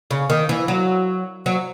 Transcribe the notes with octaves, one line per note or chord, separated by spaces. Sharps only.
C#3
D#3
E3
F#3
F#3